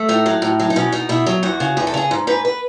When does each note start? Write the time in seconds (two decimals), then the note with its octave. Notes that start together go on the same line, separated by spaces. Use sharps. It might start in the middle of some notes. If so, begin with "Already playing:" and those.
Already playing: A3
0.09 A2 D#4
0.26 F#3
0.42 A2
0.60 F#3
0.70 D#4
0.76 B2 C#4
0.92 B2 D#4
1.09 B2 E4
1.26 F#3
1.43 E2 F#4
1.60 C#3
1.77 E2 G#4
1.87 A4
1.94 C#3 G#4
2.11 G#2
2.27 G#2 B4
2.45 B4